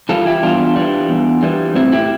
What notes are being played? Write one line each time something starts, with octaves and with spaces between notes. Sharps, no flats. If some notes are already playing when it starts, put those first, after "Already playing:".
E3 G3 F4 A4
E4 G4
E2 D4 F4
E3 G3
E2
E3 G3
A2 C4 E4
E4 G4